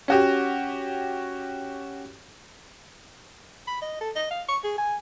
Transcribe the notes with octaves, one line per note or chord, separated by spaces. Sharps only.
C#4 F#4 G4
B5
D#5
A4
D#5
F5
C#6
G#4
G#5